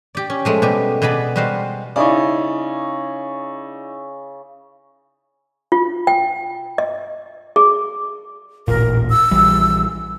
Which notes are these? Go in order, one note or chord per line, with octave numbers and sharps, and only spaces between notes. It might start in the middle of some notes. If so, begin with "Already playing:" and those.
G4 D5
C#4
F3 G#3 A3
B2 G3 G4
B2 B3 G#4 D5 B5
G3 G#3 F#4 C5 F5
C#3 D#4 E4 C#5 D5
F4
G5
D#5
G#4
D#1 A1 A#2 A#4
E6
A#1 E3 G3